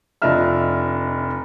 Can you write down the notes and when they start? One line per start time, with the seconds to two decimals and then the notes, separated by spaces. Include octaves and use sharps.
0.22 F1 F3 D4 D#5 E5 F6